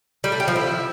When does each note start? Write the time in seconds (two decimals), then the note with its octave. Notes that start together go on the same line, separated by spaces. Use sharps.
0.24 G3
0.32 A3
0.40 G4
0.48 F3
0.56 E4